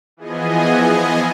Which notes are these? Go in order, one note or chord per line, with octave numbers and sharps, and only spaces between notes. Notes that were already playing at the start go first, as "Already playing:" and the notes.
E3 F3 B3 G#4 D#5 G#5